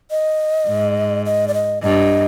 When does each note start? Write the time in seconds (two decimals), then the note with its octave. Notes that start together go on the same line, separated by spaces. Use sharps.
0.11 D#5
0.68 G#2
1.26 D#5
1.48 D5
1.54 D#5
1.82 G2 D#5